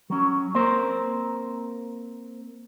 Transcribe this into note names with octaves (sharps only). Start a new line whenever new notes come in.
F#3 C#4
A#3 C4 A#4 C5